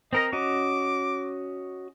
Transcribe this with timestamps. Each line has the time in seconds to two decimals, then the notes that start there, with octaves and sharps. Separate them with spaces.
0.13 C4 A#4 D#5 A#5
0.33 C#4 F#4 D#5 D6